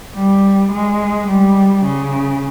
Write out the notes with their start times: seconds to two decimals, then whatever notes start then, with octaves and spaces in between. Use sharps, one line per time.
0.15 G3
0.72 G#3
1.28 G3
1.84 C#3